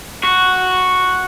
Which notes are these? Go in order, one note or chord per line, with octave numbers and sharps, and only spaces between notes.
F#4